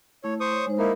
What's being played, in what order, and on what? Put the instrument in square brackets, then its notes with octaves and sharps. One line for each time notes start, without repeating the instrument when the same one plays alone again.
[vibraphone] A3 E4 [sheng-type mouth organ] C#5
[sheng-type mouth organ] C5 C#6 D#6
[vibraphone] C#5
G#3 D#4 C5
[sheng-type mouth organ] A#3 D#4 E4 [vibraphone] A#4